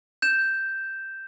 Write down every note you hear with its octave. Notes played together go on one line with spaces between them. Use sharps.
G6 E7